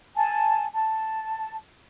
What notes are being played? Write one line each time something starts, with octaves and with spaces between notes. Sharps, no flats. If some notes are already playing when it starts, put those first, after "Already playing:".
G#5 A5
A5